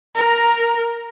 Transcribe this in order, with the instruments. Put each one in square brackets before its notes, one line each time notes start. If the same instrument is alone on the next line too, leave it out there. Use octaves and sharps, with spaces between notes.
[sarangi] A#4 [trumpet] A#5